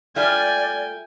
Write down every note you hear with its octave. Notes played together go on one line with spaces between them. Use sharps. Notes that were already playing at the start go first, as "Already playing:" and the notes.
G3 A3 F4 D5 G5 G#5